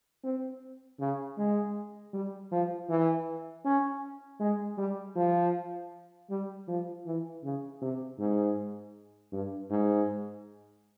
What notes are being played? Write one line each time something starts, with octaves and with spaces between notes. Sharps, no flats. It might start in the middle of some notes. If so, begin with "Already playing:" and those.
C4
C#3
G#3
G3
F3
E3
C#4
G#3
G3
F3
G3
F3
E3
C#3
C3
G#2
G2
G#2